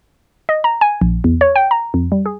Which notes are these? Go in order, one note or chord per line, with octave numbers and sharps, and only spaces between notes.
D#5
A#5
G#5
A#1
E2
C#5
G5
A#5
F2
G3
G#4